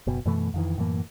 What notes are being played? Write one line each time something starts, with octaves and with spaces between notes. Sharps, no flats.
F#1 B2
F#2 B2 E3 A3
F2 D#3 E3
F#2 A2 E3 A#3